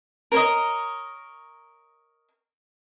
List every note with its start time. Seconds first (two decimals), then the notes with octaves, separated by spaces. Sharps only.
0.32 A#4 C#5 D#5